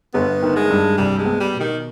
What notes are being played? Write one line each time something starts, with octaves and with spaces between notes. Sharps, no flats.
G1 B3
D#3
G#3
G2
C2 G3
G#3
B3
G3
B2
D#3